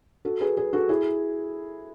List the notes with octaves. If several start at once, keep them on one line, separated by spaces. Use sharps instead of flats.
F#4 A4
G#4 B4
G#4 B4
F#4 A4
E4 G#4